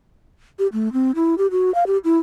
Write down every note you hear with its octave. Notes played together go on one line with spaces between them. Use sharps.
G4
A3
C4
E4
G4
F#4
F5
G4
E4